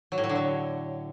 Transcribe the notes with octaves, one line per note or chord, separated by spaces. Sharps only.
F#3
A2
F#3
D3
F#3